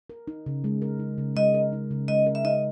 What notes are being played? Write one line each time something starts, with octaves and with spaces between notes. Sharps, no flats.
A#4
D#4
C#3
G#3
A#4
D#4
C#3
G#3 D#5
A#4
D#4
C#3
G#3 D#5
A#4
E5
D#4 D#5